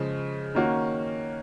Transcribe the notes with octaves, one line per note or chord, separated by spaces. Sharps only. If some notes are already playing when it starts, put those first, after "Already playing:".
Already playing: C#3 F3 G#3
D#3 A#3 C#4 F#4